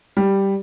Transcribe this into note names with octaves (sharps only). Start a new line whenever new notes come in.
G3